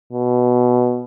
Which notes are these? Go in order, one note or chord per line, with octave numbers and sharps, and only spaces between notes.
B2